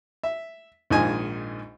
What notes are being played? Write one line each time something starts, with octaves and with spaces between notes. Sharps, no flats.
E5
A#1 G#2 D#3 F4 D#5 G#5